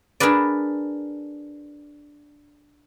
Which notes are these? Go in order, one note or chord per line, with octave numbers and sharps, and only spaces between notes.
D4 G#4 A#4 B4 D5